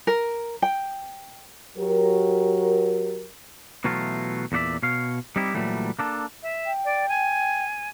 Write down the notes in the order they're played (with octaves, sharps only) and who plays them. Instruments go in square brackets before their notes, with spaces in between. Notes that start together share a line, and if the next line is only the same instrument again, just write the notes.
[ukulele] A#4
G5
[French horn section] F#3 G4 A#4
[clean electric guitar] B2 E3 F#3 A3 F4
E2 A#2 F#4 D5 E5
B2 C#5 F5
G3 C4 D#4 E4 G4
A#2 E3 F#3 G3 A3
A#3 D4 A4
[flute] E5
[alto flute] G5
[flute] D5
G#5